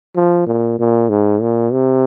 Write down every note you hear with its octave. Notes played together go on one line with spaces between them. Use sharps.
F3
A#2
A#2
G#2
A#2
C3